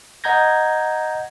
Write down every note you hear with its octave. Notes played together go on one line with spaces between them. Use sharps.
D#5 F#5 A#5 G6 G#6 A#6